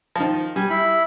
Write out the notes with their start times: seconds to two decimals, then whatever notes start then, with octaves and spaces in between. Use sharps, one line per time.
0.16 D#3 F3
0.56 G3 G#5
0.70 E4 B5